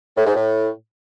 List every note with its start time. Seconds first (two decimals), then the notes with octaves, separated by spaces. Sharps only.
0.16 A2
0.25 G#2
0.34 A2